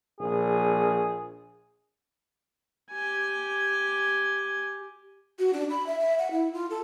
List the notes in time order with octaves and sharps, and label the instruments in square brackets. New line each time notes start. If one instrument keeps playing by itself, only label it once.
[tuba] A#1 [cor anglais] G#4
[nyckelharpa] G4 G#5
[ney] F#4
D4
B5
E5
E5
F#5
E4
F4
A4